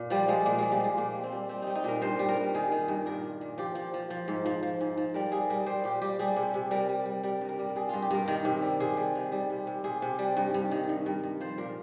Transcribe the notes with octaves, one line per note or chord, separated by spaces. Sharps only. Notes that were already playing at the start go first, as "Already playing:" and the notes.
Already playing: A#2
F3 G3
F3 G#3
A#2 A#3
A#2 G#3
G3
F3 G#3
A#2 A#3
G3
C4
G3
G3 C4
G3 D#4
D#4
A#2 A#4
G2 C5
G3
A#4
G2
D#3 G#4
D#3
G2
A#2 A#4
A#2
A#2
F3 G4
F3
F3
F3
G#2
F3
F3
G#2
F3
G3 A#4
G3 G#4
G3 A#4
G3 C5
A#2 G4
G3 G4
G3 G#4
C3
C3
G3 A#4
G3
G3
G3 A#4
G2
A#4
G3
A#4
G3 G#4
G2 F4
G4
G2 A#4
D#3 A#4
C3
G3
C3 G#4
G3
D#3
G3
C3
C3
C3 G#4
C3
G3
G2
G2
D#3
G2
G2
G2
F3 C5
A#2 A#4